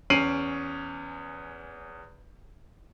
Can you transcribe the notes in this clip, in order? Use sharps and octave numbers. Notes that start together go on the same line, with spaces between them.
E2 C#4 C7 D7 D#7 F#7